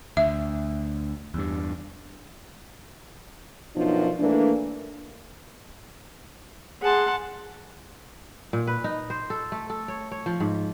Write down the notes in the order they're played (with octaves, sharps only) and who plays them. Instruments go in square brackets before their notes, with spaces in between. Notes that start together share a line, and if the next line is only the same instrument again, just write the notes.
[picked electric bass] D2 [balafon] E5
[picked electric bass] E2 G2
[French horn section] F#2 B2 F3 D4 D#4
E3 A3 A#3 D4
[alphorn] G#4 [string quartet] F#5 A5 C6
[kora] A#2
B4
D#4
C5
A4
A3
A4
C#5
C#5
F3
G#2